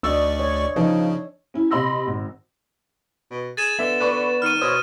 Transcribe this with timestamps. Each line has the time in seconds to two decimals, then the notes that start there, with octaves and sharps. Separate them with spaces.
0.03 D2 D4 D5 D#5 C#6 E6
0.40 C#5
0.76 C#3 F3 D#4
1.54 C#4 E4
1.71 C3 D#5 B5 C6 E6 A#6
2.07 G#1
3.31 B2
3.57 G#4 A6 E7
3.79 D3 B3 E5
4.00 B4 D5 C#6
4.42 D#3 F6 D#7
4.61 B2 C5 C#5 D#6